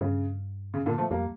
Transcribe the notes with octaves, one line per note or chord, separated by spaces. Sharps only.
G2 C#3
C#3
A#2 D3
F3 A3
F2 G3 A#3